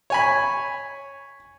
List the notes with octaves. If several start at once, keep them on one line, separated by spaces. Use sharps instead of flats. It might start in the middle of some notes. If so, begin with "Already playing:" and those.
C#5 G#5 B5